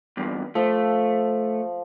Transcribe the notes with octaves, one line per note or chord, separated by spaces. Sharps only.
E2 G2
F3 A3